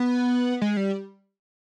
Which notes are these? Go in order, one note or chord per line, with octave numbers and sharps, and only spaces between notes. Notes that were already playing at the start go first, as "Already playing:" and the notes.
Already playing: B3
G#3
G3